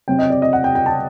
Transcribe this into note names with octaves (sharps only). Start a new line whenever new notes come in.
C3 F#3 C4 G5
D#5
D5
D#5
F#5
G5
G5
A5